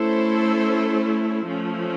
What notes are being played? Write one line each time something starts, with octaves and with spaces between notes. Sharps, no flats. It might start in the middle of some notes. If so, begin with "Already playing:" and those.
Already playing: A3 C#4 E4 A4 C5
F3 A3 C#4